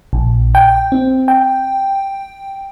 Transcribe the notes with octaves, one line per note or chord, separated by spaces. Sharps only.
A#1
G5
C4
G5